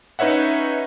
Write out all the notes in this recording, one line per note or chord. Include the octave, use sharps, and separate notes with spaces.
C#4 D#4 B4 C#5 E5 F#5